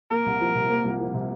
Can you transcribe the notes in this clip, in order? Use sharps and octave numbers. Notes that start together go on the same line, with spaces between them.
A#3 A#4
C2
F3
C3
A#3
C2
F3
C3